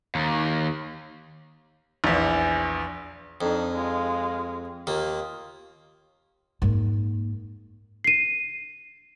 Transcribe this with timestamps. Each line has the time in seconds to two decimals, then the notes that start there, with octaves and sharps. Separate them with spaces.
0.15 D#2
2.04 A#1 E2
3.41 F2 D4 D#4
3.73 G#3 F4
4.87 D#2 A#3 F4
6.62 G#2 A#3
8.04 C7 D#7